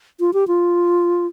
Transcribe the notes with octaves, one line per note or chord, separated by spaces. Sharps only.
F4
G4
F4